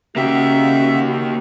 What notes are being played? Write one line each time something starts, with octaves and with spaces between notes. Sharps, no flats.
C#3 A#3 F#4 G4 E5